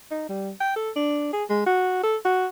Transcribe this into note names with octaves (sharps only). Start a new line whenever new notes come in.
D#4
G3
G5
A4
D4
G#4
G#3
F#4
A4
F#4